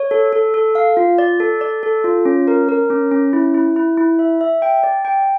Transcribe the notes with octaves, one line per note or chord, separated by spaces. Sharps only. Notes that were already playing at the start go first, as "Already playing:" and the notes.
Already playing: C#5
A4
A4
A4
F5
F4
D5
A4
D5
A4
F4
C#4
A#4
A#4
C#4
C#4
E4
E4
E4
E4
E5
E5
G5
D5
G5